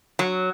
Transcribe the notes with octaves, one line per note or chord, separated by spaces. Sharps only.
F#3